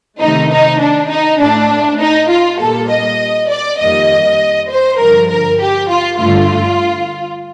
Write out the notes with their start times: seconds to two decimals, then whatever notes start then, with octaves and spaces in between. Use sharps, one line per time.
0.20 C3 D#3 A3 D#4
0.50 D#4
0.80 D4
1.10 D#4
1.40 A2 A3 D4
2.01 D#4
2.29 F4
2.60 A#2 G3 A#3 A4
2.90 D#5
3.49 D5
3.79 F2 D#3 G3 A#3 D#5
4.69 C5
4.99 G2 D3 F3 A#4
5.30 A#4
5.60 G4
5.89 F4
6.18 G2 D3 A3 F4